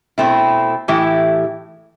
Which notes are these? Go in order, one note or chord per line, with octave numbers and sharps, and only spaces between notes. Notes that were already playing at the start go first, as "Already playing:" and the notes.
B2 A3 C4 E4
A2 E3 A3 E4 G4